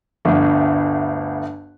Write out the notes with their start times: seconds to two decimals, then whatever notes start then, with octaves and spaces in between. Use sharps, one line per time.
0.25 G1 D2